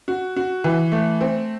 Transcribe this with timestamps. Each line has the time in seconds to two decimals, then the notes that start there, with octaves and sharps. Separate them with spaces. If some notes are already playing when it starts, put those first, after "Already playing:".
0.08 F#4
0.36 F#4
0.64 E3
0.92 A3
1.21 C4